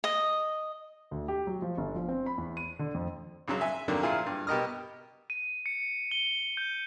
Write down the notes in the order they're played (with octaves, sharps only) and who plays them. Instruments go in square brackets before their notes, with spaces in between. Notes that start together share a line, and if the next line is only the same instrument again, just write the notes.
[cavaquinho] D#5
[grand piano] D2
G4
F#3
F3
G1
F3
C4
B5
E2
D#7
D3
F2
[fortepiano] A#1 C#3 F#3
E5 G#5
F2 D3 D#3 F#3 A#3 D4
A#2 F3 E4 F4 G#4
G2
B2 G4 A#4 D#5 D#6 F6
[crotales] D#7
C#7
G7
G6